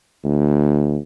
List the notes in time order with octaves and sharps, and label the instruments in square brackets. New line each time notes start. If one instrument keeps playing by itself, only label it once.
[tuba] D2